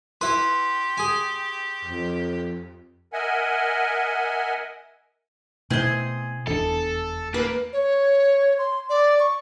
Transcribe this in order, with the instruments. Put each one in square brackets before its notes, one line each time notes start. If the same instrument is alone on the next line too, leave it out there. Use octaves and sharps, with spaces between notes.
[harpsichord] E4 B4 [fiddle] G4 [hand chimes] C6
[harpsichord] G#4 G#5
[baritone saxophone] F2
[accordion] A#4 D#5 E5 F#5 G#5
[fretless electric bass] B2 A3 [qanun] C4 E4 C5 [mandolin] G#4 D#5
[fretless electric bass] F1 E2 D4 [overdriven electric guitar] A4
[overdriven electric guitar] A#3 [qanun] B4 A5
[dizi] C#5
C6
D5
C#6